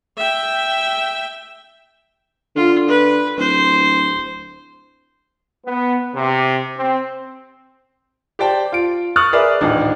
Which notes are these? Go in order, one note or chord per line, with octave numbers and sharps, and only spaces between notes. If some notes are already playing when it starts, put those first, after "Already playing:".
E5 G5
D3 F4
B4
D1 C5
B3
C3
C4
G4 C5 D5 G5 A5
F4 D7
C#6 D#6 F6 F#6 A6
G#4 A#4 B4 D5 E5
D#1 A1 D4 D#4